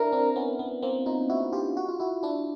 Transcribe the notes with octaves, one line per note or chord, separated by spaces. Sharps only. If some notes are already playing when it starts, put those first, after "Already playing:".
Already playing: D4 E4 A#4
C4 D4
B3 C#4
B3
A#3 C4
D#4 F4
E4 F#4
F4 G4
F#4
F4
E4 F#4
D4 E4